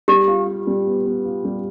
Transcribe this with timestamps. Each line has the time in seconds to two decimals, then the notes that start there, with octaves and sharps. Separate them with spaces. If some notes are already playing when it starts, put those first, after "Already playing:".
0.08 G3 G4
0.28 F4
0.47 F4
0.67 G3
0.86 B3
1.06 B3
1.25 F4
1.45 G3